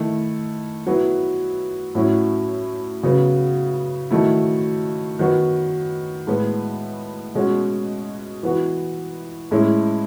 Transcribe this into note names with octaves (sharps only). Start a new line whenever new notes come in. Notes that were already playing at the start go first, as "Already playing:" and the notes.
Already playing: D#3 A3 E4
F#3 B3 E4
A2 F#3 C#4 E4
C#3 F#3 B3
D#3 F#3 A3 E4
D#3 F#3 B3 F#4
A2 G#3 B3
B2 G#3 C#4 F#4
E3 B3 F#4
A2 G#3 C#4 E4